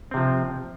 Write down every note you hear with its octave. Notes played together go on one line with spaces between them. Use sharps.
C3 F3 C4